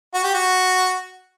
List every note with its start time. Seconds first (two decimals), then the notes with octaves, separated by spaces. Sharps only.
0.14 F#4
0.24 G4
0.34 F#4